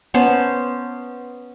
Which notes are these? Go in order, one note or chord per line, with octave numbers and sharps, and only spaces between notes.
B3 C#4 C5 A5